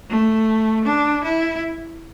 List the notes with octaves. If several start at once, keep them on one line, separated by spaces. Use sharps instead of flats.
A3
D4
E4